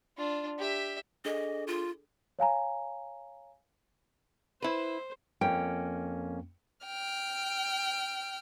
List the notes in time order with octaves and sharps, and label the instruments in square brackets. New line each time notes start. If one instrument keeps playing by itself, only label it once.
[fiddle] D4 F4
G4 E5
[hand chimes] D4 G#4 A4 [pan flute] D#5
[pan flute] F4
[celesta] C#5 F5 G#5 A#5
[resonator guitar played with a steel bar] E4 B4 [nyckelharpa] C5
[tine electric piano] F2 A#3 C#4 [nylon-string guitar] G5
[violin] G5 F6